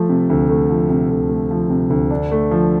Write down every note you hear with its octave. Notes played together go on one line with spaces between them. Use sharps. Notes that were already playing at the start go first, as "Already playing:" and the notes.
Already playing: F3 A3
C3
D2
A3
F3
C3
D2
A3
F3
C3
D2
D4
A3
F3